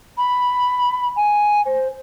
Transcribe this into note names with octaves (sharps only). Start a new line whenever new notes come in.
B5
G#5
C5